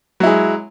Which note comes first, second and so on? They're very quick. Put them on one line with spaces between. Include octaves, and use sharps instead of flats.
F#3 E4 G#3